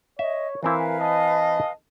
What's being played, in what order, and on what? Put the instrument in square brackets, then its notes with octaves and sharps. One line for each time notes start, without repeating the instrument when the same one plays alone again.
[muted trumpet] C#5 [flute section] D#5 [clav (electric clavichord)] E5
[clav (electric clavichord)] E3 C4 E4 [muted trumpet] A#4 [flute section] B4 F5 G#5
[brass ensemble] D#5 [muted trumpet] A5